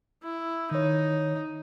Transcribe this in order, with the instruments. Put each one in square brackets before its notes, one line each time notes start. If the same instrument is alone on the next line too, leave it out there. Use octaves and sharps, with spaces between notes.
[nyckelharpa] E4
[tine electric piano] D#3 C#5 [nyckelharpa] D#4